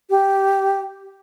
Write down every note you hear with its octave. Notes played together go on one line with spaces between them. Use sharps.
G4